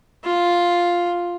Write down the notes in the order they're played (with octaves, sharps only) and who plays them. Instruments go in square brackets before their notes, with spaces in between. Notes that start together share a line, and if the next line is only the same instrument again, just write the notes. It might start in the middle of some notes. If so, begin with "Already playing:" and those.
[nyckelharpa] F4